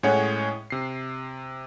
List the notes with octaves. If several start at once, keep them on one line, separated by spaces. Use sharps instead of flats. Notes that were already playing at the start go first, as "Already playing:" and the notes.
A2 G#3 C#4 C#5 F#5
C3 C7